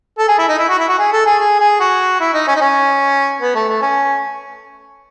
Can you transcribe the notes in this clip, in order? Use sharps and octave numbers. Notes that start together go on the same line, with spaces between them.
A4
G#4
E4
D#4
E4
F#4
E4
F#4
G#4
A4
G#4
G#4
G#4
F#4
E4
D#4
C#4
D#4
C#4
B3
A3
A3
C#4